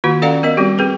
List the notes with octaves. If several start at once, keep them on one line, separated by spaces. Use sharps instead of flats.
D#3 A#3 F4 F#4
C#4 A4 D5 F5 F#5 A#5
B3 A#4 D#5
G3 C4 F#4 G4
C4 G#4 B4